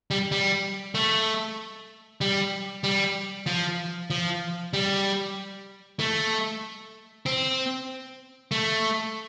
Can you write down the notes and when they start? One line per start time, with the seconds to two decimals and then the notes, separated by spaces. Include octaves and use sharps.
0.11 G3
0.32 G3
0.95 A3
2.21 G3
2.84 G3
3.46 F3
4.10 F3
4.73 G3
5.99 A3
7.26 C4
8.51 A3